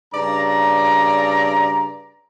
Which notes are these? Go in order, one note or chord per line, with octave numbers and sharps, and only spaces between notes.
G2 C#3 D5 A#5